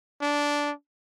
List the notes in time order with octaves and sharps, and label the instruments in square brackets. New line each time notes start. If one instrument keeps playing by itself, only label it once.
[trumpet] D4